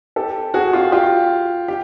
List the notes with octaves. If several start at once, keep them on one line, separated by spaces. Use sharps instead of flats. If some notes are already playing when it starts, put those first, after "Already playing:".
G4 A4
F#4 G#4
F4 G4
F4 G4
G4